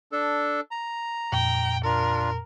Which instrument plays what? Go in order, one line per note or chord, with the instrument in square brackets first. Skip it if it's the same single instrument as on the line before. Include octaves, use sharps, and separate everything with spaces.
[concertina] D4 A4
A#5
[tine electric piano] F2 A#2 [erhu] G5
[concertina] D4 F4 [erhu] A#4